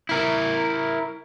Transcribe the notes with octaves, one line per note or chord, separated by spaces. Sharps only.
E4 A#4